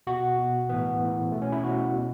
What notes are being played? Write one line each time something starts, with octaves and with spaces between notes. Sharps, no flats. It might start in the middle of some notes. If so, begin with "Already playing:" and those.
B2 F#4
B2
A2 E3 B3
A2 E3
B2 A3
C#4
E4
B2 F#4
B2